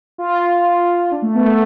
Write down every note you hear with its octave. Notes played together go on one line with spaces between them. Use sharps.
F4
D4
A3
B3
A3